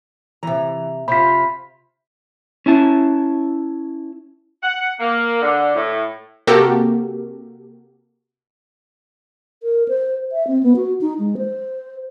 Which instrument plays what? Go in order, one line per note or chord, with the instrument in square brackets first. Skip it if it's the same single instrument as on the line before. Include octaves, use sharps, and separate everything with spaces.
[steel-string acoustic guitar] C3 A#5 [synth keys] E3
[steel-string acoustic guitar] C3 [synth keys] F4 C5 [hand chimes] B5 B6
[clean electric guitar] C#4 E4 A5
[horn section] F#5
A#3
D3
A2
[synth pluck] C3 A#3 F#4 G4 A4 A#4
[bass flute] A#4
C5
E5
C4
B3
F#4
D#4
G#3
C5